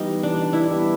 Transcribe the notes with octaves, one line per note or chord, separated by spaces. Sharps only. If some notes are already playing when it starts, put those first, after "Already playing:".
Already playing: E3 G3 B3 D#4
E3 D4
E4
G3 B3